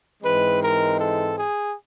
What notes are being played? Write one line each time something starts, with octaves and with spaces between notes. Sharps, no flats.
G#2 E3 G#3 C4 B4
A#4
A4
G#4